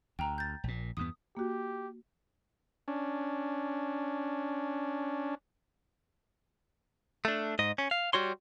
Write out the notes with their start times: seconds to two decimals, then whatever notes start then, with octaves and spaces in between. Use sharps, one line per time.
0.19 D2 G5 A#5
0.38 G6 A6
0.64 A#1 A#2
0.97 E2 G2 B3 D#6
1.37 A#3 F#4 G4
2.88 C#4 D4
7.25 A3 D4
7.59 G#2 D#5
7.78 C#4
7.91 F5
8.13 G3 F#4 C#5 C6